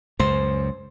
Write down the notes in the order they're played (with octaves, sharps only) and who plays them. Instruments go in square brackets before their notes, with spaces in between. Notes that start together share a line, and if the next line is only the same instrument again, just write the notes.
[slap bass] C#2 F#2 [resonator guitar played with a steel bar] C5